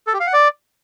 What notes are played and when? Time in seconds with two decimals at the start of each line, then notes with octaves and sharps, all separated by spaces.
0.07 A4
0.14 G4
0.20 F5
0.27 F#5
0.33 D5